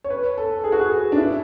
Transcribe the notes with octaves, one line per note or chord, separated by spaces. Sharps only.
C#5
B4
A4
G#4
F#4
G#4
D4
E4